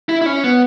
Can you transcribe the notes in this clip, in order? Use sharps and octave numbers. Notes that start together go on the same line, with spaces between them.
E4
E4
C#4
B3